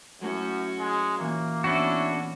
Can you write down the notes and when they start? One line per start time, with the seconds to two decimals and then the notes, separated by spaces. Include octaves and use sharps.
0.21 F#2 F#3 A3 C#4 E4 F#4
0.78 G#3
1.18 A#2 E3 A#3 C#5
1.64 B3 C#4 D4 E4 F#4